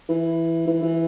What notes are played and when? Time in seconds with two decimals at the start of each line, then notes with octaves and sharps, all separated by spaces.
0.09 E3
0.67 E3
0.83 E3